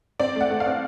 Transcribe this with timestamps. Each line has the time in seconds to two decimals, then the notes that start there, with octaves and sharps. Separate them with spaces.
0.20 C4 D5
0.36 A3 F#5
0.50 A3
0.60 F5
0.66 C4